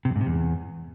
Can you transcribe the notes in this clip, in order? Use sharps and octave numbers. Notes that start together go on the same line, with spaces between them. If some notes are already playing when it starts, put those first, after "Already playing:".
C3
F2
G#2
C3
E2